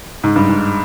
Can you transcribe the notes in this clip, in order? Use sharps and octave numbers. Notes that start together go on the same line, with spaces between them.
G#2
G2
G#2